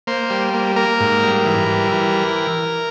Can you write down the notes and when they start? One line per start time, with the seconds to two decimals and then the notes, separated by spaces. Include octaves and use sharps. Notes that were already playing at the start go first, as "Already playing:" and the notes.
0.07 A#3 C5
0.30 G3
0.53 A#3
0.76 A#3 A#4
1.00 G#2
1.23 G3
1.45 E3
1.69 G3
1.92 E3